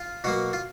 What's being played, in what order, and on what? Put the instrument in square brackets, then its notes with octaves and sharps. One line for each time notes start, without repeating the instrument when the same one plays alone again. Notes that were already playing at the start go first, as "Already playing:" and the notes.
Already playing: [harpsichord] F4
B2 F#3 A#3 F#4
F4